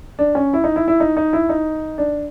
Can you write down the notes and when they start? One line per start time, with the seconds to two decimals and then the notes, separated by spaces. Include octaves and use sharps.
0.19 D4
0.35 C#4
0.53 E4
0.64 D#4
0.76 E4
0.88 E4
1.00 D#4
1.17 D#4
1.33 E4
1.49 D#4
1.98 D4